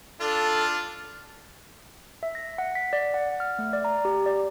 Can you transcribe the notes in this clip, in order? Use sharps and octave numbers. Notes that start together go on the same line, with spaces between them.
D4 F4 A4 F5
E5
A#6
F#5
B6
D5
F#5
F6
A3
D5
A#5
G4
D5